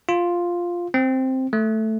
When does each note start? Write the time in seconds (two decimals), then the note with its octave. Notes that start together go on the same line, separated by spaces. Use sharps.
0.09 F4
0.94 C4
1.53 A3